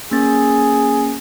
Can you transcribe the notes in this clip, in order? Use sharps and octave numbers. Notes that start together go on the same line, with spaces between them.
A#3 C#4 G#4 A6